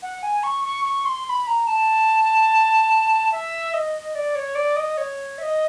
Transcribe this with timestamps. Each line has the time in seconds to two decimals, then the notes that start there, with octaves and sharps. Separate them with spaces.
0.02 F#5
0.23 G#5
0.43 C#6
0.65 C#6
0.85 C#6
1.05 C6
1.25 C6
1.29 B5
1.47 A#5
1.67 A5
3.32 E5
3.74 D#5
4.15 D5
4.35 C#5
4.55 D5
4.76 D#5
4.97 C#5
5.38 E5
5.42 D#5